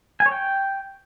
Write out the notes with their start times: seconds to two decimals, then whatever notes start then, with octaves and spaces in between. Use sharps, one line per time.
0.20 G#5
0.26 C#5
0.31 G5